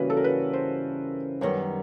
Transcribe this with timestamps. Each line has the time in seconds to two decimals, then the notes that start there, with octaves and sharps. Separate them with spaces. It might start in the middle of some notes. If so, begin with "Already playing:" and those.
Already playing: C#3 E3 G3 A#3 C#4 F#4 B4
0.10 A4
0.17 A#4
0.24 B4
0.53 C5
1.41 F#2 D#3 G3 B3 C#5